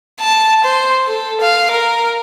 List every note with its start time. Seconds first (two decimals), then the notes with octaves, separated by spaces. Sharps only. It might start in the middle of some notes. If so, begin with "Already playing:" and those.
0.20 A5
0.64 C5
1.06 A4
1.41 F5
1.71 A#4